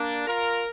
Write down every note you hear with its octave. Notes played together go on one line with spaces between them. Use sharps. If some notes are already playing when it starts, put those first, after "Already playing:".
Already playing: A#3 D4
F4 A#4